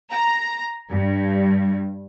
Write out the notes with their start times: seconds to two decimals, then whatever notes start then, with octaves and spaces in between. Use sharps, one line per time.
0.12 A#5
0.90 G2